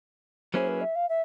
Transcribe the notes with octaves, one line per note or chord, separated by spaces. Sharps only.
F#3 A#3 C#4 E4 G#4 C5
B4
E5
F5
E5